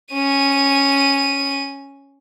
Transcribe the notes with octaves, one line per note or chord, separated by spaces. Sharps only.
C#4 D#7